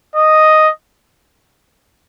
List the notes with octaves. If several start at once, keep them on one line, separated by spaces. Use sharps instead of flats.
D#5